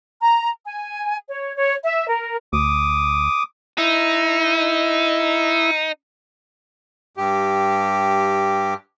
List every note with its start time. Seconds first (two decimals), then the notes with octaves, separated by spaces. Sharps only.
0.21 A#5
0.65 G#5
1.29 C#5
1.56 C#5
1.84 E5
2.08 A#4
2.53 D2 D6 D#6
3.78 D#4 E4
7.17 G2 G4